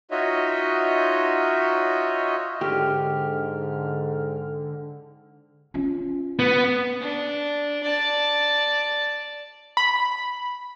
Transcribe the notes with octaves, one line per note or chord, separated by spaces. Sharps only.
D#4 F4 F#4 C#5 D#5 E5
G#2 D3 G4 G5 F6
C#4 F4
B3
D4
D5 A5
B5